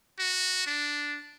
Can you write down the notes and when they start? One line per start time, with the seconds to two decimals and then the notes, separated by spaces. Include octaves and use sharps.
0.19 F#4
0.67 D4